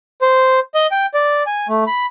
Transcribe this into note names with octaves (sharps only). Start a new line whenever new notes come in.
C5
D#5
G5
D5
G#5
A3
B5